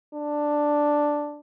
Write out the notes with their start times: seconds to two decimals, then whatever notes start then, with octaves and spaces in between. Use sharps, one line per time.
0.14 D4